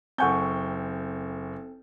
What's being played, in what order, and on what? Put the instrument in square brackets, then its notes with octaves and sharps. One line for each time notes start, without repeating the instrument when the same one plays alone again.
[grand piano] F#1 C#6 G6 [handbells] C4 A4 [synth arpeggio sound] F#5 G#5 A5